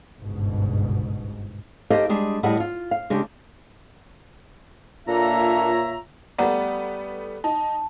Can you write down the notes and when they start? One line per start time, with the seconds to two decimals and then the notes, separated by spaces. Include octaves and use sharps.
0.19 G1 C#2 G#2 B2
1.90 D#4 G4 A4 C5 D#5 F5
2.09 G3 G#3 D4 G#4
2.43 A2 G3 G#4 D#5 F#5 A5
2.60 F4
2.91 F5
3.10 C#3 G#3 D4 G4
5.08 A#2 A#3 D4 F4 A4 C#5 E5 A#5
6.39 G3 A3 B3 F#5 A#5
7.44 D#4 A5